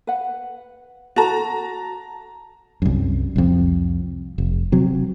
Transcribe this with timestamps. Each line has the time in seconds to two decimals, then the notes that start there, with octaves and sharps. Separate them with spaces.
0.07 B4 F#5
1.16 F#4 A4 A5 A#5
2.82 C2 F#2
3.36 C2 F2
4.38 F1
4.72 C3 F#3